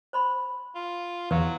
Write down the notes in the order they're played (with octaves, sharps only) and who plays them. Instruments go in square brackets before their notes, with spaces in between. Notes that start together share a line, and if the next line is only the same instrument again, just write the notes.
[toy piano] C5 B5 C6
[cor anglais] F4
[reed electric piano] E2 [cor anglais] F#3 [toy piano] B4 F5